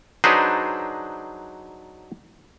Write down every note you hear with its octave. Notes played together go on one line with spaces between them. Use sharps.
F#3 D4 D#4 G#4 B4 C5